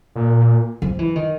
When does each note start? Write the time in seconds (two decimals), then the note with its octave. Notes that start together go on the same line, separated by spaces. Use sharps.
0.16 A#2
0.82 F3
0.99 E3
1.15 D#3